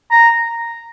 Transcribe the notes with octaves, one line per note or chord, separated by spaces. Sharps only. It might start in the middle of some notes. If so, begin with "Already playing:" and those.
A#5